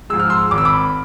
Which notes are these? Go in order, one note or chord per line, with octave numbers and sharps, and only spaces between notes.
G#2 F3 G#3 E6
F6
C6 E6
G#1 D6
E6
B5 D6